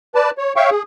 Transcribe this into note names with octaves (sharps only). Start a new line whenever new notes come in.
B4 D5 A5
C#5
C#5 E5 F5 G5 C#6
G#4